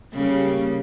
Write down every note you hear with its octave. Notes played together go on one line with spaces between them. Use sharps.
C#3 G3 A#3